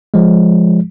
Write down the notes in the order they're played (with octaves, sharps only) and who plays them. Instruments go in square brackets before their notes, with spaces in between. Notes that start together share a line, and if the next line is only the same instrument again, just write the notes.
[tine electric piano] F3 G#3